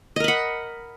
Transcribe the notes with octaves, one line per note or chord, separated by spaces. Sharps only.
A#4 D#5 F#5 B5